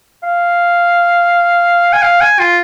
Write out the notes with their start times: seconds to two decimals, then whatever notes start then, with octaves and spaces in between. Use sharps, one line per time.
0.23 F5
1.93 G#5
2.03 F5
2.21 G#5
2.40 F4